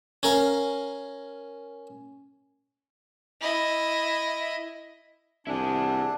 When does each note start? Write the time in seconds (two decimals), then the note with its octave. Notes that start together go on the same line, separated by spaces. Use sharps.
0.23 C#4 A#4 F5
3.41 E4 D#5
5.47 C2 D4 E4 G#4